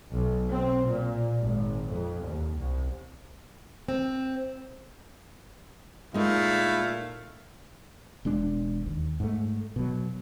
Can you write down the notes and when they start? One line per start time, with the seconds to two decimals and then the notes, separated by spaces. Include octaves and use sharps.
0.12 B1
0.51 C4
0.87 A#2
1.42 G#1
1.90 F2
2.24 D#2
2.57 C2
3.88 C4
6.14 A#2 G#3 A3 D#4 E4 F5
8.25 E1 G#3 D4
8.86 D#2
9.20 G#2 A3
9.76 B2 F#3